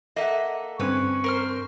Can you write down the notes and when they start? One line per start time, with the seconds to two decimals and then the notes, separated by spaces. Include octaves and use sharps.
0.16 A#3 A4 D#5 E5 F#5
0.79 G2 D3 C4 C#4 B4 C#6
1.24 A#4 C5 F6